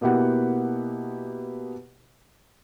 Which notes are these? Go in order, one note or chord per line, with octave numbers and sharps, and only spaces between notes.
B2 A#3 B3 E4 G4 F#5